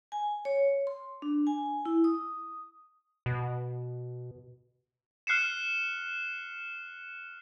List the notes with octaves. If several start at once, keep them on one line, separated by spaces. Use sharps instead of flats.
G#5
C#5
C6
D4
G#5
E4
D#6
B2
F6 F#6 C7 C#7 E7